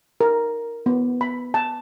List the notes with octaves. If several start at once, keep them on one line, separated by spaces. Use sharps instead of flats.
A#4
B3
B5
A5